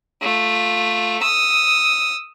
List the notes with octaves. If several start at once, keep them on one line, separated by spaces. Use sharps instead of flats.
A3 F4
D#6 E6